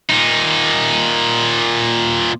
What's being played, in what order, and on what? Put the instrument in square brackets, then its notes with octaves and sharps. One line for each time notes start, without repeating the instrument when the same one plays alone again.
[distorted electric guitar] A#2 D#4